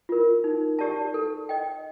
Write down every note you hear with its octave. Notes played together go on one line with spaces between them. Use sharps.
F4 A#4
D#4
G4 D5 A5
A4
D#5 G5